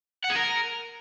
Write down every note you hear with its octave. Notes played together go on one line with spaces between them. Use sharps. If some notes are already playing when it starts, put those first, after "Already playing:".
F#5
G#4
A#4